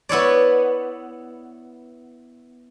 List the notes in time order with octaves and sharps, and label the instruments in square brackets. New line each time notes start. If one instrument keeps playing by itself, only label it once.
[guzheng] B3 E4 C#5 D5